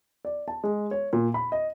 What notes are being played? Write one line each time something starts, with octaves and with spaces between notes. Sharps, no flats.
D5
A5
G#3
C#5
A#2
B5
D#5